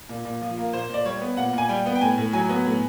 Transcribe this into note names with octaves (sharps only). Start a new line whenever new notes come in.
A#2
A#2
F3
A#3
A#2 C5
A#2 D5
G3 C#5
B3
A#2 F#5
A#2 G#5
G3 G5
B3
G5
A2 G#5
A2
F#3 G#5
B3
A2